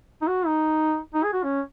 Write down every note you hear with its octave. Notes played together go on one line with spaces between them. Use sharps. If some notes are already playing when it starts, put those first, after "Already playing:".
D#4
F#4
D#4
D#4
G#4
F#4
C#4